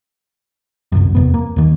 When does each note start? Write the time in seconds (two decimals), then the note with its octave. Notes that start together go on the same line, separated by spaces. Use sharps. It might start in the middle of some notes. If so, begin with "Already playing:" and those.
0.92 G1 C2 F#2
1.15 E2 C3 B3
1.34 A#3
1.56 D#2 D#3